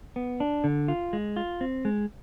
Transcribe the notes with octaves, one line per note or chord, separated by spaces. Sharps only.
B3
D4
D3
F4
G#3
F4
C4
G#3